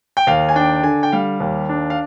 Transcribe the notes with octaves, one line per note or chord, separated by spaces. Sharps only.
G5
D#2 F5
G#5
D4 G5
D3 G#5
G5
G3 F5
D#2
D4
F5